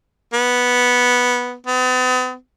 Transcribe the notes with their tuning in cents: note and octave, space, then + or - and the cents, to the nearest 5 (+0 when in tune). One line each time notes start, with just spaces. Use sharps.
B3 -5
B3 +45